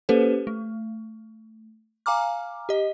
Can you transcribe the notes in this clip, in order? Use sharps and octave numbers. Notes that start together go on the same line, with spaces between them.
A#3 C#4 G4 A4 B4 C5
A3
F5 G#5 A#5 D6 F6
G4 D#5